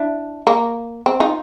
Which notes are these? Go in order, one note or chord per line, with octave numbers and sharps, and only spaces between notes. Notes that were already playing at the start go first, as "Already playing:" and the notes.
Already playing: D4 E4
A#3
C4
D#4 F4